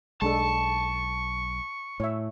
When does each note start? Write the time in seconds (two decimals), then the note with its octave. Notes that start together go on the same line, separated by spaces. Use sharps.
0.22 B1 G#3 D4 A4 A5 C#6
2.00 A2 C#5 E5